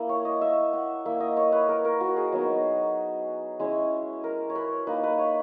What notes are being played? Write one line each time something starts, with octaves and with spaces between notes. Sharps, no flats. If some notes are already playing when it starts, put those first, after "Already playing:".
Already playing: A#3 E4
C#5
D#5
E5
F#5
A#3 E4 E5
D#5
C#5
B4
A#4
A#4
F#4
G#4
F#3 B3 D#4
G#3 C#4 E4
A#4
C#5
B4
A#3 D#4 B4
B4
C#5